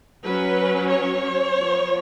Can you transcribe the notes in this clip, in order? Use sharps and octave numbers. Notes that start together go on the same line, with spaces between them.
F#3 C#4 B4
C#5
F3 B3